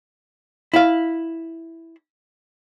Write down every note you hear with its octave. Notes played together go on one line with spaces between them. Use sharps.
E4 F5